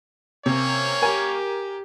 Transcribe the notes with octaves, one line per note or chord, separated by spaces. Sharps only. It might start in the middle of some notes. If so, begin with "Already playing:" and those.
C3 A#3 C#4 C#5
G4 A#4 G#5